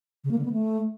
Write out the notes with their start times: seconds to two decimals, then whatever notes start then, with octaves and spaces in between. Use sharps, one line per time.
0.24 C#3
0.31 A#3
0.38 D3
0.45 B3
0.53 A3